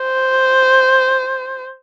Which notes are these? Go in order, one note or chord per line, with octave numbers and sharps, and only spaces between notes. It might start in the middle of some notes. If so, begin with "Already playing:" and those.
Already playing: C5